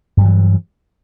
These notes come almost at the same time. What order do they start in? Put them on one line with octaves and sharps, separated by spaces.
G2 F#3 E3